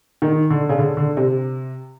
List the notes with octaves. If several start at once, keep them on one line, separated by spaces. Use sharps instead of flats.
D#3
D3
C#3
D3
D3
C3